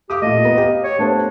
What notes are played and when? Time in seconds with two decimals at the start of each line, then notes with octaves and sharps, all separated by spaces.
0.10 G4 F5 D6 D#6
0.22 A#2 A3 D#5
0.44 B3 A#5
0.58 G4 F5
0.84 C#5
0.99 A3 B3 D4 C5